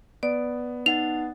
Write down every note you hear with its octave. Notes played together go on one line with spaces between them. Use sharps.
B3 D5
D#4 F#5 A6 F7